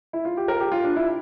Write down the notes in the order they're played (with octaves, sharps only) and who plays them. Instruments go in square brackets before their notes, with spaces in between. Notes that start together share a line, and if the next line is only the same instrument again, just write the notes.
[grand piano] E4
F4
G4
A#4
G4
F4
D4
E4